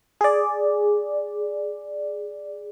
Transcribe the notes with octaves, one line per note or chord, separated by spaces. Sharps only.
G#4 D5